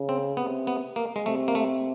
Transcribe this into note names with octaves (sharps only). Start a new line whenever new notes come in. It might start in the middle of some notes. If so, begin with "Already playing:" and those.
Already playing: C#3
C4
C3 B3
B3
A#3
G#3
C3 A3
A#3
A3